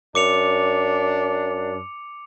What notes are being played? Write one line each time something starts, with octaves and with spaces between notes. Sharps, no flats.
F#2 D4 D6 C#7 F7